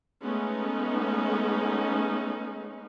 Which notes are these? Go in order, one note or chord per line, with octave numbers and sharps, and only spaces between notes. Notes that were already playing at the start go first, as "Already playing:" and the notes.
G#3 A3 B3 C#4 D#4